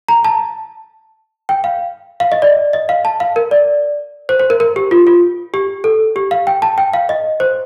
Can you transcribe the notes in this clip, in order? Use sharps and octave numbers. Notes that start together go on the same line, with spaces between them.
A#5
A5
G5
F5
F5
D#5
D5
D#5
F5
A5
F5
A#4
D5
C5
C5
A#4
A#4
G4
F4
F4
G4
A4
G4
F5
G5
A5
G5
F5
D#5
C5